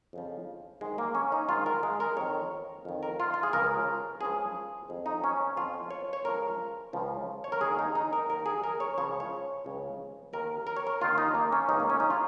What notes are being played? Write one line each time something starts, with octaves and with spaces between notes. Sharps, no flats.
F2 C#3 F3
G#2 D#3 G#3
A#3
C#4
D#4
G#2 D#3 F4
A#4
G#3
A#4
F2 D#3 C#5
F2 D#3
A#4
F4
F4
G#4
C#2 C#3 F3 A#4
C#2 C#3 F3 G#4
F2 F3
D#4
C#4
F2 F3 F4
C#5
C#5
C#2 C#3 F3 A#4
C#2 C#3 F3
C#5
A#4
D#2 D#3 G#4
D#4
D#4
A#4
D#2 D#3 A#4
G#4
A#4
C#5
C#2 C#3 F3 C#5
C#5
C#2 C#3 F3
D#2 D#3 A#4
A#4
C#5
A#4
D#2 D#3 F4
D#4
A#3
C#4
C#2 C#3 F3 D#4
A#3
C#4
D#4
F4